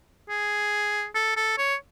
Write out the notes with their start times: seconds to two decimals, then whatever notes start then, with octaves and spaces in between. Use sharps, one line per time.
0.29 G#4
1.15 A4
1.37 A4
1.58 C#5